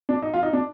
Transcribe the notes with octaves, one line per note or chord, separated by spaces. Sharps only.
D4
D#4
F4
D#4
D4